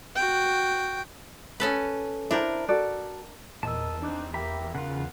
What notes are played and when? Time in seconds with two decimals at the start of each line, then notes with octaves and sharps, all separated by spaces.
0.15 F#4 G5
1.60 C#4 A4 B4
2.31 D4 E4 A#4 C5 A#5
2.69 F#4 A4 D5
3.63 E2 A#2 A#4 D#5 A5 E6
4.02 C4 D4 D#4 D6 F#6
4.34 A#3 G4 E5 G5 A#5 B5
4.75 C#3 F4 A#4 F5 F#5 F#6